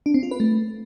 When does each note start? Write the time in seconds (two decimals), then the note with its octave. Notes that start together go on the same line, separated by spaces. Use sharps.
0.06 D4
0.14 C4
0.23 F4
0.31 B4
0.40 A3